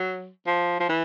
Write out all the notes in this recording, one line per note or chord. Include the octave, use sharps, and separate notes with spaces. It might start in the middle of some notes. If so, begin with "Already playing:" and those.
Already playing: F#3
F3
F3
E3